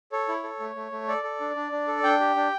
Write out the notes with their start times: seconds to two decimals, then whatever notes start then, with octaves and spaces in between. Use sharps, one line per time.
0.12 A4 C#5
0.28 E4
0.44 A4
0.59 A3
0.75 A3
0.92 A3
1.08 A4 D5
1.23 A4
1.40 D4
1.56 D4
1.72 D4
1.88 A4
2.03 D4 G5
2.20 G4
2.36 D4